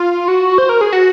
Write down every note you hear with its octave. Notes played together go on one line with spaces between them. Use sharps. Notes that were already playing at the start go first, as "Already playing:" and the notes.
Already playing: F4
F#4
C5
A#4
G#4
F#4